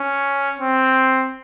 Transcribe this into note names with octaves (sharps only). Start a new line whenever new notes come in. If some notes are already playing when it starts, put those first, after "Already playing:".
Already playing: C#4
C4